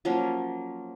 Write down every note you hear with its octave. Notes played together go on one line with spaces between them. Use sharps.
F3 F#3 A#3 C#4